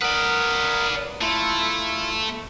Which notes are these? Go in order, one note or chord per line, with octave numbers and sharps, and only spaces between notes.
A#4 B4 D5 F#5 D#6
A3 E4 F4